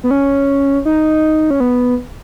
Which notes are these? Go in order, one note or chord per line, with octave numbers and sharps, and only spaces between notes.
B3
C#4
D#4
C#4
B3